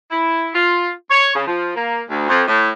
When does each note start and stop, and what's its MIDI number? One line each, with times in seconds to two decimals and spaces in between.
0.11 0.49 64
0.54 0.90 65
1.11 1.33 73
1.35 1.47 49
1.47 1.75 53
1.76 2.03 58
2.10 2.26 38
2.29 2.42 41
2.48 2.70 45